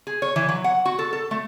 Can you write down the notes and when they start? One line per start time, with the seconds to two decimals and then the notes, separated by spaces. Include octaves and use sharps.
0.07 G#4
0.22 C#5
0.36 E3
0.49 F#3
0.64 F#5
0.85 F#4
0.99 A4
1.13 A4
1.31 A3